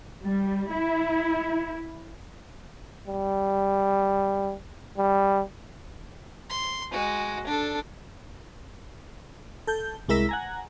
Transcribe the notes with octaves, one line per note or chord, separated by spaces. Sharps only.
G3
E4
G3
G3
C6
G#3 F#4
D4 A4
A4 G6
C2 G#3 E4 A#4 E6 B6
F#5 G#5 A#5